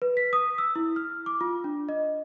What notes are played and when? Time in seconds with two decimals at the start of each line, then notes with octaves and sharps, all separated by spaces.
0.02 B4
0.17 B6
0.33 D#6
0.58 E6
0.76 E4
0.96 F6
1.26 D6
1.41 F4
1.64 D4
1.89 D#5